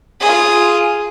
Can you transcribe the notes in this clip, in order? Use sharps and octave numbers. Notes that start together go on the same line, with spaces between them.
F4 G#4